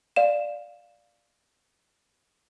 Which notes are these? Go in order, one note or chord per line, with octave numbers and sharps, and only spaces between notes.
D5 F5 E7